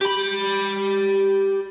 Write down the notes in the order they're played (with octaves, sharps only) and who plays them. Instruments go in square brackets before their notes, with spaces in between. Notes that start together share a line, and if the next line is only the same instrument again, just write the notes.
[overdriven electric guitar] G4 B5